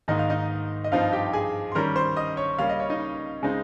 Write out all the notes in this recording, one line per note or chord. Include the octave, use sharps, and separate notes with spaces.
G#2 D#3 A#3 D#4 D#5
F5
D#4 D#5
D#5
G2 F3 C4 D#4 F4 F5
G4 G5
G5
G#4 G#5
C6
D#3 G3 C#4 A#4 A#5
C5 C6
D#5 D#6
C#5 C#6
C#3 G3 A#3 C#4 F5
D#5
C#5
D#4 D#5
C#3 G#3 C4 D#4